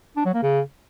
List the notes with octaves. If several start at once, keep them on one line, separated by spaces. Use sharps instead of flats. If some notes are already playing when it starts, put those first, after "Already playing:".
D4
F#3
A#3
C#3